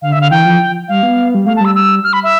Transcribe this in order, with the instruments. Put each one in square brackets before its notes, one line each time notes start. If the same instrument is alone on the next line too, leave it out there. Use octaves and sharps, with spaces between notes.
[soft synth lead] D3 [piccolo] F5
[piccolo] E5
[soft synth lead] D3 [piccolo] F5
[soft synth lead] E3 [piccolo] G5
[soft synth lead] F3
[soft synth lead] G3 [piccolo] F5
[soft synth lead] B3
G3
[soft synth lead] A3 [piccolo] F5
[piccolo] A5
[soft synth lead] G3 [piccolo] E6
[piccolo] E6
F6
B5
E5